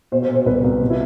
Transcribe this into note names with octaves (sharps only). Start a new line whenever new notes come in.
B2 C5
C5
B2
C5
C2 B4
C2
B2
E4